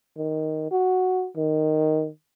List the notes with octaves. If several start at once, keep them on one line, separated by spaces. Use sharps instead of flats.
D#3
F#4
D#3